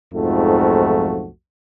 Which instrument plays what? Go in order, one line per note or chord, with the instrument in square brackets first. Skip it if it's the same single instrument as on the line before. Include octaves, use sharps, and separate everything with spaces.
[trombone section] B1 F2 G#2 F3 A3 F#4